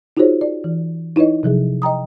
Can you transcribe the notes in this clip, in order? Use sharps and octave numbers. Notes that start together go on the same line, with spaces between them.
D#4 F4 F#4 G#4 C5 C#5
D5
E3
D#4 E4 B4 C#5 D#5
C3 F3 F#3 G#4
D#5 G5 A#5 D#6